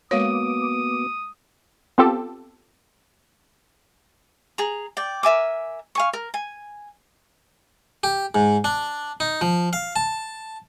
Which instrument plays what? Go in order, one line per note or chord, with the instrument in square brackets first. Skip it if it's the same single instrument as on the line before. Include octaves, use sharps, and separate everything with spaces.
[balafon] G#3 C#5 [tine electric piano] A#3 F#4 [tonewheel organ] B3 D6 [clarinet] D#6
[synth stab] B3 C4 F4 G4 A4
[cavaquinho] G#4 A#5
D5 G5
A#4 E5 G#5 D6
F5 G#5 C#6
A#4
G#5
[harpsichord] G4
G#2
D4
D#4
F3
F5
A5